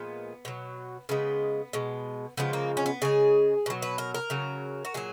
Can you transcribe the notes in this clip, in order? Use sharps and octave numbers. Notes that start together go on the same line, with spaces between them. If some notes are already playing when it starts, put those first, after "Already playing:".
Already playing: A#2 F3 G#3 B3
B2 F#3
C#3 G#3 B3
B2 G#3
C#3 F3 G#3 B3
A#3
C#4
B3
C#3 G#3 G#4
B2 F#3
B4
A#4
A#4
C#3 F#3
F#4
A#2 F#3 G#4